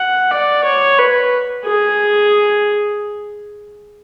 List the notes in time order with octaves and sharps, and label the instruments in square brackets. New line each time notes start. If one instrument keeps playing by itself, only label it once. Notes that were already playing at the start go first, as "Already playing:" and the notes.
Already playing: [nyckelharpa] F#5
D5
C#5
B4
G#4